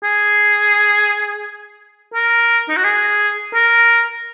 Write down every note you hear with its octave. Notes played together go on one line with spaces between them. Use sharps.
G#4
A#4
D#4
F#4
G#4
A#4